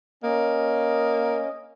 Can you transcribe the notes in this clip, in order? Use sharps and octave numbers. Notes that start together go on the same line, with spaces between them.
A#3 C#4 D#5